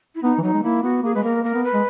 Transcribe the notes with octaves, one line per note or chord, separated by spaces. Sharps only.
E4
B3 D#4
E3
F#3 D#4
G#3
A#3 E4
B3 F#4
A#3 G#4
G#3 B4
A#3 A#4
A#3 A#4
B3
B4
G#3